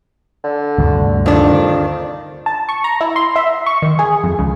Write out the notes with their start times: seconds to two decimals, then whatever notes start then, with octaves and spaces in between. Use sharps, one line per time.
0.44 D3
0.78 D2 G2 C3
1.26 F2 D#3 D4
2.46 A5
2.69 C#6
2.84 A#5
3.01 E4
3.16 C6
3.36 E5
3.66 C#6
3.82 D#3
3.99 G#4
4.24 F2
4.39 C#2